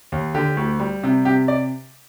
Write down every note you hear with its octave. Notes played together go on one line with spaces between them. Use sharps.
D#2
D3 G4
D2
G3
C3
C3 G4
D5